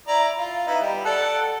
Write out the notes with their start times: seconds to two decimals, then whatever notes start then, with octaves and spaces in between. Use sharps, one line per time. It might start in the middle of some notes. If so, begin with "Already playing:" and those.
0.07 E4 D5 A#5
0.38 F4
0.67 B3 D#4 E4
0.81 G3
1.05 A4 D5 F#5